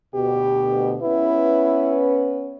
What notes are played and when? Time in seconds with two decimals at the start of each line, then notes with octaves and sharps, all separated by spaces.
0.15 D2 B2 G4
1.02 B3 C#4 E4 B4